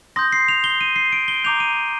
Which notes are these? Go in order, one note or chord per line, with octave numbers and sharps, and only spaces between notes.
C6 D#6 G6 A#6
C7
F7
G7
D#7
C7
D7
G7
A#5 D6 G6 F7
D#7